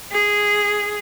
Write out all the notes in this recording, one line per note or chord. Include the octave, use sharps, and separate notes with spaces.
G#4